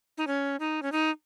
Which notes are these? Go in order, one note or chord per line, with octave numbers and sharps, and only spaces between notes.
D#4
C#4
D#4
C#4
D#4